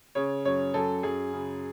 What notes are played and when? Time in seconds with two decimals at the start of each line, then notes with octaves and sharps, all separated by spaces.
0.15 C#3 C#5
0.45 F#2 C#5
0.74 F#2 A4
1.03 F#2 G#4
1.33 C#3